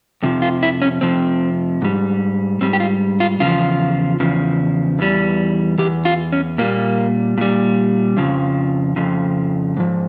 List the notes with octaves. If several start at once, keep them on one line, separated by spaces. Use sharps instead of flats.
F2 C3 F3
F4
E4
C#4
F2 C3 F3 C4
G#2 G3
G#2 G3 C4
G4
F4
F4
E2 C#3 F3 F4
E2 C#3 F3
E2 E3 G3
E2 E3 G4
F4
C#4
A#2 G3 A#3
A#2 G3
F2 C#3 F3
F2 C#3 F3
G#2 F3